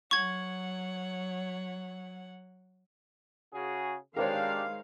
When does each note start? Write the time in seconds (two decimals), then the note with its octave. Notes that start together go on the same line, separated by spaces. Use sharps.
0.11 F#3 C#5 F#5 C#6 G#6
3.53 C#3 F#4 G#4
4.17 D#3 G#3 D4 G4 A#4 C5 C#5 F5